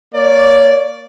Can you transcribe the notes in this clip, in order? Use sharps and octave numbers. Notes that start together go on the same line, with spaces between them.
A#3 C#5 D5